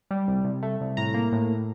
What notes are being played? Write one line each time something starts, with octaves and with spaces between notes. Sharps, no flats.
G3
C2
C2
A3
C2
A2 A#5
A#3
A2